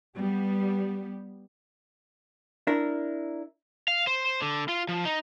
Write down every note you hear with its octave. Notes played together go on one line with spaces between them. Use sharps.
G3 B3 G4
D4 E4 A#4
F5
C5
D3
F4
F3
D#4